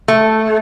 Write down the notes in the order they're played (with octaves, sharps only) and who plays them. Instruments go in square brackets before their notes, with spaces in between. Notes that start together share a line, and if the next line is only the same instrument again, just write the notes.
[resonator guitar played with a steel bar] A3